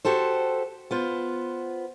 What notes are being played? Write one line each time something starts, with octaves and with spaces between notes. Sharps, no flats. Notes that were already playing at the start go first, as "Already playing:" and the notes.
F#4 G4 A4 C5
B3 F4 C5